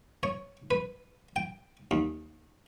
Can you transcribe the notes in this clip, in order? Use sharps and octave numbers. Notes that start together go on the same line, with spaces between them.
C#5
B4
G5
D#2